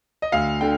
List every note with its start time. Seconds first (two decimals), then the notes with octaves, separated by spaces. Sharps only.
0.22 D#5
0.32 D2 F5
0.61 D3 G5